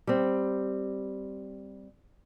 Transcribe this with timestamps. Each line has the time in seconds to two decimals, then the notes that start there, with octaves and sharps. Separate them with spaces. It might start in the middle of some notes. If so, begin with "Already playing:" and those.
0.07 G3 C4